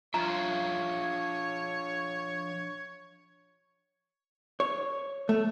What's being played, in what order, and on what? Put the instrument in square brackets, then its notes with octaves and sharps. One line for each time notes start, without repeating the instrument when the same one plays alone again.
[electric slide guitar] F3 D4 E5 [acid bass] F4 [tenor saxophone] C#5 [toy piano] A#5
[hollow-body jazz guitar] C#5
A3